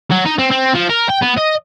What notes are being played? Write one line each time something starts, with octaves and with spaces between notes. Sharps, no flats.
F#3
D#4
C4
C4
F3
A#4
G5
B3
D#5